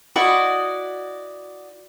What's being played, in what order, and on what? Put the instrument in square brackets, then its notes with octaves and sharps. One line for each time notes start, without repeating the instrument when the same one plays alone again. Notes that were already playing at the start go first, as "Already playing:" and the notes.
[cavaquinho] E4 F#4 D5 D#5